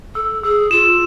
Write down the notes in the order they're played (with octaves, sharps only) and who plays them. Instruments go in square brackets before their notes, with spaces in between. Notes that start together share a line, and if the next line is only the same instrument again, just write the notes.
[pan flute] A4 [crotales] E6
[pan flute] G#4 [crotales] E6
[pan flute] F4 [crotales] E7